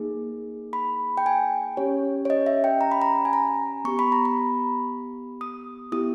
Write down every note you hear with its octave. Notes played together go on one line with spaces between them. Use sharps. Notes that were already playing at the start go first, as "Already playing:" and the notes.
Already playing: A#3 D#4 G#4
B5
G5
G#5
C#4 G4 C#5
C#5
D#5
E5
G5
A#5
B5
A#5
G#5
A#5
B3 G4 C#6
B5
A#5
B5
D#6
B3 E4 G4 D#6